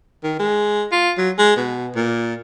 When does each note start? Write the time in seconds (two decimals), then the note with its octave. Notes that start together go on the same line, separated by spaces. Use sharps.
0.24 D#3
0.40 G#3
0.92 F4
1.18 F#3
1.38 G#3
1.57 B2
1.96 A#2